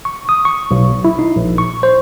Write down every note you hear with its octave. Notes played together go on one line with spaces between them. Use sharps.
C#6
D#6
C#6
B1
E4
D#4
A#1
C#6
C5